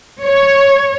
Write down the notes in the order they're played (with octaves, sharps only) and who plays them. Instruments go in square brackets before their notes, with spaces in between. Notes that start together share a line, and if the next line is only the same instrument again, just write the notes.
[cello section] C#5